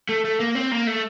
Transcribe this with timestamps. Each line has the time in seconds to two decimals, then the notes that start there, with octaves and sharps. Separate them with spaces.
0.09 A3
0.25 A3
0.40 A#3
0.55 C4
0.72 A#3
0.87 A3